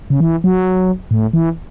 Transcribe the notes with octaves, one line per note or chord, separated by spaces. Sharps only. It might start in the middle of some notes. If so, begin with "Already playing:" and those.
C#3
E3
F#3
A2
E3